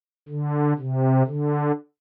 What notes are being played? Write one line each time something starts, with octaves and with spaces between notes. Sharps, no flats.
D3
C3
D3